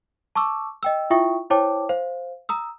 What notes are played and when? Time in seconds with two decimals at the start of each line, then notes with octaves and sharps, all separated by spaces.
0.36 A5 C#6 D6 E6
0.83 D#5 G5 E6
1.10 E4 F4 E5 G5 C#6 D#6
1.50 E4 C5 C#5 G5 A5 D6
1.89 C5 F5
2.49 A#5 D#6 E6